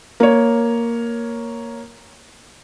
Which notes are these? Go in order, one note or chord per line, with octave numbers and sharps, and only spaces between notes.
A#3 C#5